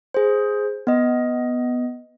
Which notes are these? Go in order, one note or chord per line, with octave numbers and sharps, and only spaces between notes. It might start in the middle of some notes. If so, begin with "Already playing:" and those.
G#4 C5
B3 D#5